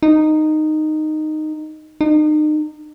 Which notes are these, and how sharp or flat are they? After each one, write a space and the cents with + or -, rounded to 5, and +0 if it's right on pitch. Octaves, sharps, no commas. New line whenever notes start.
D#4 -10
D#4 -35